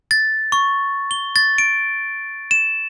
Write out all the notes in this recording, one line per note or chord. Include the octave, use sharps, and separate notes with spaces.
A6
C#6
G7
A6
D7
E7